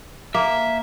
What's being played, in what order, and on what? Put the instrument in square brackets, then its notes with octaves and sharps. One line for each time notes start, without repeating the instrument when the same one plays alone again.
[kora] A#3 [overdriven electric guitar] E5